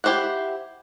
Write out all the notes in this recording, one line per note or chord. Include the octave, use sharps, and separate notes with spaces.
E4 G4 C5 E5 F#5